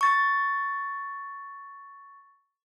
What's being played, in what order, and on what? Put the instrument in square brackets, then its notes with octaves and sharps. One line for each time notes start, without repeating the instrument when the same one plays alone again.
[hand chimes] C#6 A6